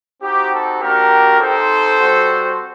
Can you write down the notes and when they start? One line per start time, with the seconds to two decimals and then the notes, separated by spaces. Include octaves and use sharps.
0.22 C4 D#4 F#4 G4
0.52 A4
0.81 A#3 D4 F#4 G4 A#4
1.40 C4 D#4 G4 A4 C5
1.99 G3 C4 F#4